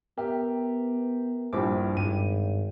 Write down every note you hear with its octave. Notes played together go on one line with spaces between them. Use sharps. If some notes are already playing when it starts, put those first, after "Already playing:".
B3 G4 A#4 E5
A#1 G2 E4 C5 D6
G#1 G2 G5 D#7